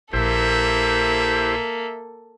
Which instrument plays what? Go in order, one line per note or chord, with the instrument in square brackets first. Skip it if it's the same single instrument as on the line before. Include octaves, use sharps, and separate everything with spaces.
[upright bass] A#1 [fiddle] A#3 A4 [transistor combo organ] E4 G4 C5 [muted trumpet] E5